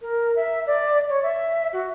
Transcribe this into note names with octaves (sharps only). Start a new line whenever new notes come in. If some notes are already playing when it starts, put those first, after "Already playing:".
A#4
E5
D5
C#5
E5
F#4